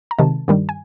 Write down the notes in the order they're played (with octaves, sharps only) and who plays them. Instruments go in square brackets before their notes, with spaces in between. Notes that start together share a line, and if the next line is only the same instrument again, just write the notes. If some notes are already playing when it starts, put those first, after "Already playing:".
[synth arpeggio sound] A#5
C3 D#3 G#3 A5
G2 D#3 G3
G#5